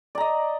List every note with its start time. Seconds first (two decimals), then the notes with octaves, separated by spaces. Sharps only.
0.15 D5
0.18 A#5
0.20 D#5